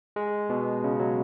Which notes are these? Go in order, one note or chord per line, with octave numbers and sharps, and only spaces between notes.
G#3
B2
C#3
F#3